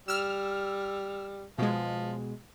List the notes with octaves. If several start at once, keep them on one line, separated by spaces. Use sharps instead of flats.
G3 E6 F6
B2 F3 G#3